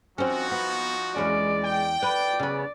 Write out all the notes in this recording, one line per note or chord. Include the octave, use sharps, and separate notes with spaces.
F3 C4 C#4 D#4 F#4
B3
E2 G#3 C#4 D5
G5
B4 D5
C#3 B3